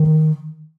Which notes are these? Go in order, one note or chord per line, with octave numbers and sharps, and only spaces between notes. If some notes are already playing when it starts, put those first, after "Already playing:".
Already playing: D#3